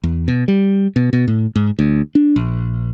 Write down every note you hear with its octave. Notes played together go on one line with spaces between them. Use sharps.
E2
B2
G3
B2
B2
A2
G#2
D2
D4
A#1